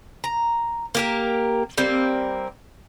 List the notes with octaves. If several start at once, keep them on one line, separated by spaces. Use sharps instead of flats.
A#5
A#3 G4 A#4
G3 A#3 C4